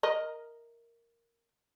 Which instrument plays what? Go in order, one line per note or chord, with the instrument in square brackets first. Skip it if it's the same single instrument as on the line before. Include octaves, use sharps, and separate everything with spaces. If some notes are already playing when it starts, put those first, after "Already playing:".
[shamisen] A#4 D#5